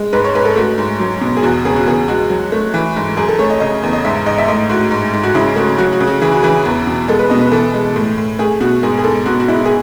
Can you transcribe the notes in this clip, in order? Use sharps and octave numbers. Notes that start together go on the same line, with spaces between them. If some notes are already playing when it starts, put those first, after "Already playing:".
Already playing: G#3
G#2 B4
C#5
G#2 B4
A4
A3 F#4
G#2
F#3
B2
G#4
E2 F#4
C#3 G#4
F#4
E2 G#4
G#3 F#4
F#3
A3
E3
G#2
F#2 G#4
A4
A3 C#5
D#5
C#3 D#5
E2
D#5
G#2 E5
G#2 D#5
E5
A2 D#5
A2 F#4
G#2
G#2
F#4
C#3 E4
A3 F#4
F#3 F#4
F#4
C#3
F#4
E3 G#4
F#4
E3 G#4
E2
B2
G#3 A4
B4
B2 D#5
B4
E3 A4
G#3
A2
A2
A3 G#4
B2 F#4
G#2 G#4
G#4
G#2 A4
B2 F#4
F#4
G#3 E4
G#4